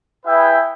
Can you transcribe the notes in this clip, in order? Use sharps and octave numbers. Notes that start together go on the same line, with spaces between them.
E4 G#4 B4 E5 G5